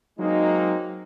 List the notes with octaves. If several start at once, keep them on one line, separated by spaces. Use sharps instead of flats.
F#3 G#3 A#3 C4 D#4